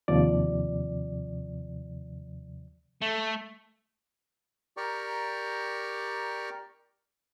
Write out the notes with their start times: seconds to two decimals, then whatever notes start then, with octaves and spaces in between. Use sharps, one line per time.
0.08 D#2 C3 F3 D5
3.02 A3
4.77 G4 A#4 D5 G5 A#5 C#6